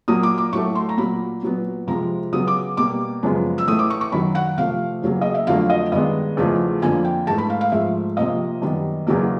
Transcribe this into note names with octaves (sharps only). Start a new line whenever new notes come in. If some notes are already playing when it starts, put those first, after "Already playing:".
A#2 F#3 A#3 D#6
D6
D6
A2 F#3 A3 C#6
C6
A#5
A#2 F#3 A#3 B5
A#2 F#3 B3
C3 F3 G#3 A#5
C#3 F#3 B3 D#6
D6
B2 G3 A#3 D6
F#2 C#3 F3 G#3 B3
E6
A2 E3 A3 D#6
D6
C#6
C#6
F#2 D#3 F#3 B5
F#5
C3 F3 A3 F5
E2 C#3 F#3 A#3
D#5
E5
F2 D3 F#3 A3 F5
D#5
G2 D#3 G#3 B3 D#5
E2 C#3 F3 A3
F2 D3 F3 A#3 G#5
G5
G#2 E3 A3 A5
B5
F5
F5
G#2 F3 A3 E5
C3 F3 A#3 D#5
F#2 D#3 G3 B3
E2 C#3 F#3 A#3